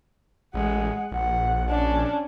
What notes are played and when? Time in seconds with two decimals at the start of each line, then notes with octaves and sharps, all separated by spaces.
0.54 A1 G#3 F#5
1.12 A#1 F#5
1.70 C#4 D4